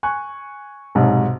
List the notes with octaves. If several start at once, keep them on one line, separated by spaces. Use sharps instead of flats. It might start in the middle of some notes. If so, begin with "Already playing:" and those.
G#5 C#6 F#6
B1 G#2 C3